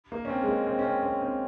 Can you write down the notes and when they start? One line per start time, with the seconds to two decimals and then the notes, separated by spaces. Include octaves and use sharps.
0.12 A#3
0.25 C#4
0.30 C4
0.42 G#3
0.48 A#3
0.67 C4
0.79 C#4
0.85 C4
1.03 C#4
1.22 C4